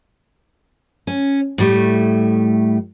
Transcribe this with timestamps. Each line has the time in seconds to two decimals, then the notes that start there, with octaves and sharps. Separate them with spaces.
1.07 C#4
1.58 A2 G3 A3